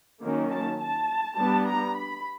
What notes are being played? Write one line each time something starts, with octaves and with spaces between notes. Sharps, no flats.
D#3 F#3 A#3 C#4
A5
A5
G3 B3 D4 A5
A#5
B5